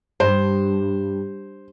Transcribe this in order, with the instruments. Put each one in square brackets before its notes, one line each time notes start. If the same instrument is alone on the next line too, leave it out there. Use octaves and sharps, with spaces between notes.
[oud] G2 [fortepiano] C5